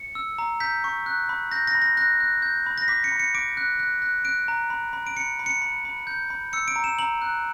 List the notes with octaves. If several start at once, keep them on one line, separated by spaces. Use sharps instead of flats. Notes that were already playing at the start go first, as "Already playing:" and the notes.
Already playing: C#7
E6
A#5
G6 B6
C#6
F#6
B5
G6 A#6
A#6
B5
A#6
F#6 A#6
F#6
G6
B5
A#6
D6 B6
C#7
B5
C#7
D6 D7
F#6
F#6
F#6
F#6 D7
A#5
B5
B5
D7
B5 C#7
B5
C#7
B5
B5
G6
B5
E6 C#7
D7
A#5
E7
A#5 F#7
F#6